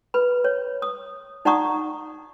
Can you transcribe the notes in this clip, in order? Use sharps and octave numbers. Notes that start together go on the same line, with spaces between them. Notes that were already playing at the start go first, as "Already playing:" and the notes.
B4 B5
C#5
D#6
D#4 D5 F#5 A#5 C#6 D#6